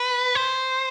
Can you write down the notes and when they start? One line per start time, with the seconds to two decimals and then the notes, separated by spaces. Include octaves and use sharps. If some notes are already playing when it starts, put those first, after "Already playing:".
Already playing: B4
0.35 C5